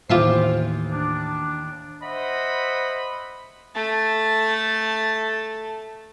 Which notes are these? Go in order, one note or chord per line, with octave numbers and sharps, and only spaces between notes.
D#2 A2 E3 F4 C5 E5 D6 C7
D4
C5 D#5 E5 F#5 B5
A3 A5